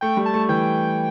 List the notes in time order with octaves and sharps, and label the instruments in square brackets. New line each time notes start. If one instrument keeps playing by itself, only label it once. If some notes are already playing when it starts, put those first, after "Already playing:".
[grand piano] A3 [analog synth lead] G5
[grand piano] G3
[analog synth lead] A5
[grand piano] A3
[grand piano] E3 [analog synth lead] G5